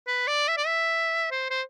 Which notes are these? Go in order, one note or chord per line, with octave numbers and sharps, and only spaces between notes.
B4
D5
E5
D5
E5
C5
C5